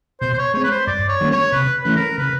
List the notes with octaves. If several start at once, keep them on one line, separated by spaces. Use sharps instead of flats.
B2 C5
C5
C#5
G#3 C4 C#5
B4
C5
G2 D5
C#5
D#3 G3 A#3 C#4
C#5
C3 B4
E3 A3 C#4 B4
A#4
C#3 B4